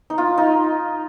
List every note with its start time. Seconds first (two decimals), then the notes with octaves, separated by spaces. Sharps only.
0.10 D#4
0.18 F4
0.38 D#4